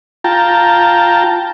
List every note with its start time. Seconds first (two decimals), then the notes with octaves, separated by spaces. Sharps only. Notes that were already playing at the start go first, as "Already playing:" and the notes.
0.24 F4 G5 A5 A#5